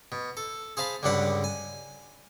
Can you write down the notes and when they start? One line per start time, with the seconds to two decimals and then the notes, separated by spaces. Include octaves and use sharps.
0.12 B2
0.37 A4
0.77 G#4 C5 F5 A5 B5
1.03 C#2 G2 D3 D4 F#5 B5
1.44 G#5